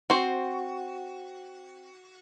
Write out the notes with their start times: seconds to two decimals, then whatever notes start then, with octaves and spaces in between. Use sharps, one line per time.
0.10 C4 F#4 C5